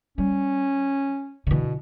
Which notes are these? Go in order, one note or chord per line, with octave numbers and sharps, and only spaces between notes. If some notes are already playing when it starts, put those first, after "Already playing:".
G3 C#4
B2 D3 E3